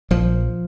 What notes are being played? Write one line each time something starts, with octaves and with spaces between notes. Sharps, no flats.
A#1 F3